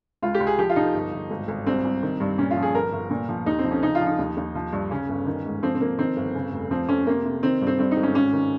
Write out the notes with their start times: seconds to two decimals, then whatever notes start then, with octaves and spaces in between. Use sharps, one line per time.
0.22 C#2 F4
0.34 G4
0.40 C#2
0.47 G#4
0.58 F3 G4
0.69 F4
0.76 F3 D#4
0.94 G1
1.12 G1
1.30 G#1
1.48 G#1
1.67 C2 C4
1.84 C2
2.03 D#3
2.20 G2
2.38 A#2 C#4
2.51 F4
2.57 F3
2.62 G#4
2.74 G1 A#4
2.93 G1
3.11 A#2
3.29 F3
3.46 D#2 D#4
3.59 C4
3.64 F3
3.71 C#4
3.83 C#3 D#4
3.95 F4
4.01 F3
4.07 D#4
4.19 D#2
4.37 D#2
4.55 F3
4.73 G2
4.91 C#3 C#4
5.09 G1
5.27 D#3
5.45 G#2
5.63 F3 C4
5.75 C4
5.81 F3 A#3
5.98 D#3 C4
6.17 G1
6.35 C#3
6.53 F1
6.71 F3 C4
6.89 F2 C#4
7.07 C3 A#3
7.25 C3
7.43 D#3 C4
7.61 G2
7.67 C4
7.79 G2 C4
7.91 D#4
7.97 G#1
8.03 C#4
8.15 G#1 C#4
8.33 D#3